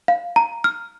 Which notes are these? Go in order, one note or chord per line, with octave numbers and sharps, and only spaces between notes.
F5
A#5
F6